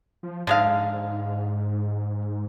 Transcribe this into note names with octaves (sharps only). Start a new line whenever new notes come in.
F3
G#2 D3 G#3 F5